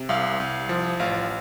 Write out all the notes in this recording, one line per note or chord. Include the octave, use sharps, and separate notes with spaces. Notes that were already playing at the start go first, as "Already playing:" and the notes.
Already playing: C3
C2 F5
C2
F3
A1 F5